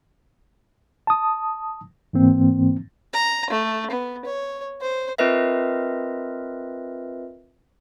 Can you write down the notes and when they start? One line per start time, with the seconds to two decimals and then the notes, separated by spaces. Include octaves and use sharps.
1.07 A5 D#6
2.13 G#2 E3 A#3 C4
3.13 A#5
3.50 A3
3.91 B3
4.25 C#5
4.82 C5
5.18 C4 F4 A#4 B4 D#5 E5